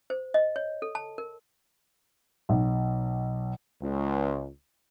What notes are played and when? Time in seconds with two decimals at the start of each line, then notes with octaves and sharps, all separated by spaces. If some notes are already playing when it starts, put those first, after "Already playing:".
0.10 C5
0.34 D#5
0.56 C#5
0.82 A4
0.95 A5
1.18 A#4
2.49 B1
3.82 C#2